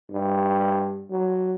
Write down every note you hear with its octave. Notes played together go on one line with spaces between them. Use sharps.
G2
F#3